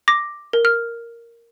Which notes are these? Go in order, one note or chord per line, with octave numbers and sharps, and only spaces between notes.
D6 A#6
A#4
F6